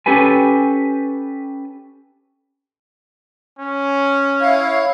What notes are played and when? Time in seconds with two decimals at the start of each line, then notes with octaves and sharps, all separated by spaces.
0.06 C#4 G4 A4 B4 G#5
3.59 C#4
4.41 E4 C#5 F5